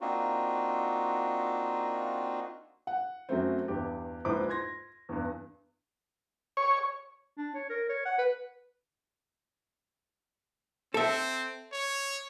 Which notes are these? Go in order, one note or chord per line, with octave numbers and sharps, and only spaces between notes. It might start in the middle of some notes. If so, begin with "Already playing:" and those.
A#3 C4 D4 D#4 F4 F#4
F#5
F#2 F#3 A3 C4
E2 G2 G4
A#1 G#2 E4 B4 C5 D6
C6 G#6 A#6
E2 G2
C#5
D4
C#5
A#4
C#5
F#5
B4
C4 A4 E5
C#5